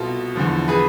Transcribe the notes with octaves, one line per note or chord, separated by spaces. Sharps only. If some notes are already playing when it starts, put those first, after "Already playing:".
Already playing: C2 B2 F4 A4
E2 D3 F3
G#4 B4